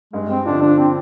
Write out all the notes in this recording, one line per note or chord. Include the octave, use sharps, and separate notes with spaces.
G2 G#3
C4
D3 F3 C4 D4 F4
D4
C4